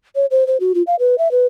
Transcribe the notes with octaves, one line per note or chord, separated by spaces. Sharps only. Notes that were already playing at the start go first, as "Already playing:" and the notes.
C#5
C5
C5
F#4
F4
F5
B4
E5
B4